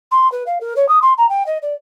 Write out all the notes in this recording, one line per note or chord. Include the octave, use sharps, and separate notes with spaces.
C6
B4
F5
A#4
C#5
D#6
C6
A#5
G5
D#5
D5